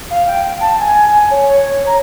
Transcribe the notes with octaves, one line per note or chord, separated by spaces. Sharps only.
F5
G5
A5
G#5
C#5
A#5